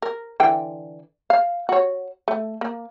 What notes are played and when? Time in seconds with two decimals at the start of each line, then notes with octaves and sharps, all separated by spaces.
0.02 A#4
0.40 D3 E3 G5
1.30 F5
1.69 F#4 C#5
2.28 A3
2.61 A#3